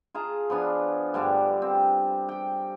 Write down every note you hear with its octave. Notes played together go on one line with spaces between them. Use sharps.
F4 G#4 A5 A#5
F3 B3 D4 G#5
G2 D3 D4 F4
C4
G4 G5